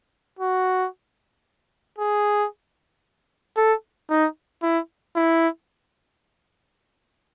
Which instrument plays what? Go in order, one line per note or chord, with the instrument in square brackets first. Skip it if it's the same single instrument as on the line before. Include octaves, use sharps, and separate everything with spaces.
[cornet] F#4
G#4
A4
D#4
E4
E4